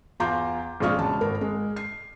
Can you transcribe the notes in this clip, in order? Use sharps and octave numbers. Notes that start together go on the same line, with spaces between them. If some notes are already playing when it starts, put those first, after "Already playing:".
E2 F4 A#5 C6 D6 G6
A#1 C3 G#3 F4 C#6 F6
E1 C#2 A5
G#1 A#4
G#3
C7